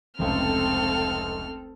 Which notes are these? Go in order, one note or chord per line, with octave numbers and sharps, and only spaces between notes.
F1 C#2 C4 A4 F6